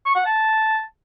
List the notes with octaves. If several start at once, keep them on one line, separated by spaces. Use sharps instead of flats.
C#6
F#5
A5